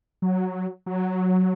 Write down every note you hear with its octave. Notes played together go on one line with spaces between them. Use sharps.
F#3
F#3